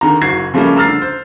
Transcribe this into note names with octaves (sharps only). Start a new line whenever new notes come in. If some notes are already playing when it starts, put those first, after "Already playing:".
D3 D#3 A#5
F#1 F#4 G#6 C7
C#3 F3 G3 A3 A#3 C#4
A#5 E6 F6 A6 C7
D3
C5